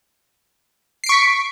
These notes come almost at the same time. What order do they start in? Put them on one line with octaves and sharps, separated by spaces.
C7 D7 C#6 B6